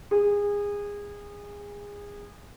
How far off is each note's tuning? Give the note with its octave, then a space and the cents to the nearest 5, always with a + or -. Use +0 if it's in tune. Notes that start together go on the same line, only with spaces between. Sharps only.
G#4 -25